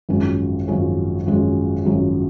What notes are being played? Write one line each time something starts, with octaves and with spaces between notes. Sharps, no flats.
G#1 F#2 F3 G#3 C#4
G#1 F#2 F3 G#3 C#4
G#1 F#2 F3 G#3 C#4
G#1 F#2 F3 G#3 C#4